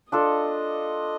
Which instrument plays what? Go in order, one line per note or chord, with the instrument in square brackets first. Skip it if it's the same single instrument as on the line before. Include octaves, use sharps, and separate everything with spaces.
[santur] D4 F4 A4 [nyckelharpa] D#5